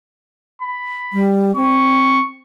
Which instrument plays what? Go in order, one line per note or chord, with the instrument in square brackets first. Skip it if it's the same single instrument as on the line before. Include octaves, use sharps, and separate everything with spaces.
[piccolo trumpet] B5
[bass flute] G3
[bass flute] C4 [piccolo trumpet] C#6